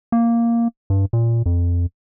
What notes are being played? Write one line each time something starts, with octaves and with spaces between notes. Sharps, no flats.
A#3
G2
A#2
F2